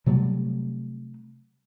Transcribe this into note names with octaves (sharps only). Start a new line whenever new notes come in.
C3 F#3 G3 A3